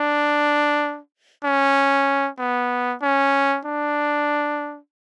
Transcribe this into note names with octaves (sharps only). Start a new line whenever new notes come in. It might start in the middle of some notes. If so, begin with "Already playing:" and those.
Already playing: D4
C#4
B3
C#4
D4